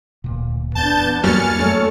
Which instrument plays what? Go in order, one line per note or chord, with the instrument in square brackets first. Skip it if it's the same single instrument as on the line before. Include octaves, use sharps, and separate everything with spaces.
[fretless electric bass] D1 A#2
[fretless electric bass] E2 [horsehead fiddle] B3 D4 [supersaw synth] A5 G6 A6
[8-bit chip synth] G2 F#3 G3 [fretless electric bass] A#3 [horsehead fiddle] G#5 [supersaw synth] F6 A6 C#7
[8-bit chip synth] F#2 [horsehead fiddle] A3 C#5